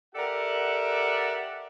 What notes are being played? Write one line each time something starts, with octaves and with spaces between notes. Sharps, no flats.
G4 A4 A#4 D5 E5 F#5